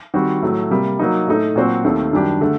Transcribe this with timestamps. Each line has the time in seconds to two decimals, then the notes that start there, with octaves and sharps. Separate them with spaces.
0.14 D#3 G3 C4 F#4
0.43 A2 F#3 A3
0.70 C3 G3 A#3
0.99 F#3 A#3 D#4
1.27 A2 A3 D#4 A4
1.56 A#2 F#3 C4 F#4 C5
1.85 D#2 D#3 A3 C4
2.13 F#2 D#3 G3 D4 G4
2.41 D3 A3